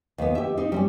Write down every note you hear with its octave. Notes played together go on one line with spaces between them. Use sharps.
D#2 B3
G4 E5
C4 D#4
G3 C4 C#4